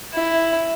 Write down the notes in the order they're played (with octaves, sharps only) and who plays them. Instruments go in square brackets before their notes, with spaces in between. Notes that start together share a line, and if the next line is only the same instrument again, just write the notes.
[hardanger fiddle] E4